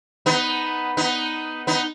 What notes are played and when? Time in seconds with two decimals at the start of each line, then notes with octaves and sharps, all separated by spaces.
0.26 B3 D#4
0.97 B3 D#4
1.67 B3 D#4